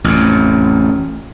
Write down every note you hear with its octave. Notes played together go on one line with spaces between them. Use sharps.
A1 F2